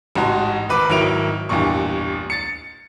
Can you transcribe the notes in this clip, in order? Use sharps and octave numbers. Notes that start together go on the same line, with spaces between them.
A1 G#2 F#4 A5
G#1 B4 D6
G#1 D#3 F#3 E4 D7 F7
A1 E2 G2 A#2 C#6
A6 C#7